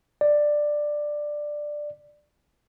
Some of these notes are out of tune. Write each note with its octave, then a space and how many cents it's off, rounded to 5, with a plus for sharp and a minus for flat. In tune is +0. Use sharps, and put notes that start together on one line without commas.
D5 +10